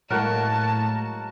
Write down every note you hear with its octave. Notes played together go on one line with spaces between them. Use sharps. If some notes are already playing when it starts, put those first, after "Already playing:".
A2 F#3 G#3 A#3 F#4 A#4 A5